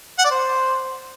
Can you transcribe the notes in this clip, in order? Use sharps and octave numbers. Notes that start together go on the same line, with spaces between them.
F#5
D5
C5